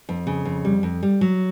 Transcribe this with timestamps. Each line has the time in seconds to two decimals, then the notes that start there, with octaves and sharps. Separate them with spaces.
0.09 F2
0.27 C#3
0.45 F2
0.65 G3
0.83 F2
1.03 G3
1.21 F#3